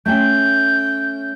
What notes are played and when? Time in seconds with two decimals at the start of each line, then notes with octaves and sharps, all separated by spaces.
0.06 A3 C#4 G5 G6